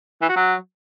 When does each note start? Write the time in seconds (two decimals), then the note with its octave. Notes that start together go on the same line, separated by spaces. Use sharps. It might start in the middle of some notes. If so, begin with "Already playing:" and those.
0.22 E3
0.29 F#4
0.36 F#3